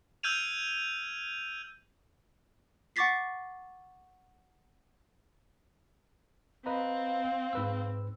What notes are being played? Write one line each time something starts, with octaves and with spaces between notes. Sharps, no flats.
E6 F6 G6 G#6 D#7 F7
F#5 C#6 D6 A6 B6 C7
C4 B4 D#5 F5 A#5
G#2 B4 E6